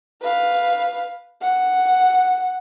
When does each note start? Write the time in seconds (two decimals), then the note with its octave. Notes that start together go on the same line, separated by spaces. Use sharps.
0.22 B4 F5
1.41 F#5